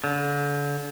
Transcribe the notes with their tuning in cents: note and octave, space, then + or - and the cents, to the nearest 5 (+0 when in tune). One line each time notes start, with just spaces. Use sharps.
D3 -35